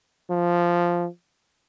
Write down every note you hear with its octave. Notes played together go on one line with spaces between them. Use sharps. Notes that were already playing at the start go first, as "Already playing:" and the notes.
F3